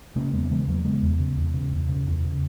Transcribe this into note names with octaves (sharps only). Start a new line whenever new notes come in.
C#3 A#3 C#4
E2 G#3 B3
F#3
C#3 E3 G#3
E2 F#3 A#3
C#3 G#3 B3
E2
C#3
E2
C#3
E2
C#3
E2
C#3